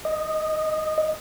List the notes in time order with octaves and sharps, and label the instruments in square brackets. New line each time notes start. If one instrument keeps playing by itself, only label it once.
[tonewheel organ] D#5